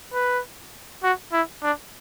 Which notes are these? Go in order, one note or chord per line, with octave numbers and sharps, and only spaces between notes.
B4
F#4
E4
D4